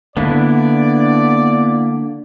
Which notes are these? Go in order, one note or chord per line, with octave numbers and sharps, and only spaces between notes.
D3 A#3 B3 D4 E4 D5